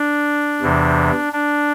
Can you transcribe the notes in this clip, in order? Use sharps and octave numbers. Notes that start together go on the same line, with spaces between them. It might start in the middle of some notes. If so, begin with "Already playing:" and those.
Already playing: D4
E2 C3 E3
D4